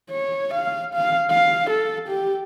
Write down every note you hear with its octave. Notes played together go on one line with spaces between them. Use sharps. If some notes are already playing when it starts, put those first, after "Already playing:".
C#5
F5
F5
F5
A4
G4